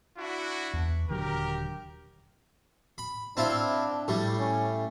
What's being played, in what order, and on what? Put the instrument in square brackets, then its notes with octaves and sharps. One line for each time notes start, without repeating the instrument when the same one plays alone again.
[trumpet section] D4 E4 F#4
[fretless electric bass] E2
[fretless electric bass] D#1 D3 F#3 [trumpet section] G4 A#4
[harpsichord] B5
[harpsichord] C4 E4 F4 [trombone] D4
[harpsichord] A2 G3
[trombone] C#4